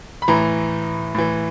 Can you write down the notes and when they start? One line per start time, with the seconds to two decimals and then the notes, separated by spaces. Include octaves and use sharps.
0.22 B5
0.28 A2 E3 A#5
1.15 A2 E3